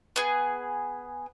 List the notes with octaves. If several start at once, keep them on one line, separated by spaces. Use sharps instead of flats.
B3 G#4